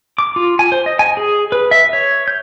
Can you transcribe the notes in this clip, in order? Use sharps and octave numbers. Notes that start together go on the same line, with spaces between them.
D6
F4
G#5
C5
D#5
G#5
G#4
B4
E5
C#5
G6